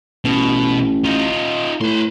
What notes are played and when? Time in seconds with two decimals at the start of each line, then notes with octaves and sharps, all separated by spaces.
0.25 A1 B2
1.04 D#4 F4
1.81 A2 B4 C6